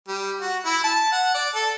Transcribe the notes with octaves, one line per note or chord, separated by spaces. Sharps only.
G3
F#4
E4
A5
F#5
D5
A4